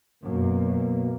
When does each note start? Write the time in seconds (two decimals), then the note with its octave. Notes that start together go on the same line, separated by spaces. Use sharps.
0.23 F#2 B2 A#3